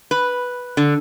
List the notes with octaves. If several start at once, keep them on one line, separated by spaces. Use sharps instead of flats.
B4
D3